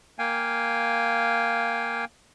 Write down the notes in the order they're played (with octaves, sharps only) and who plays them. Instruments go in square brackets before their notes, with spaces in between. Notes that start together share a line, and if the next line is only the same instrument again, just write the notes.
[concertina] A#3 F5 G5 G#5